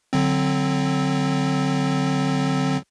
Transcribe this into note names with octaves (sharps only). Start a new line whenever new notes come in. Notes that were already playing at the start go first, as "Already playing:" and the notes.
D3 F#3 C4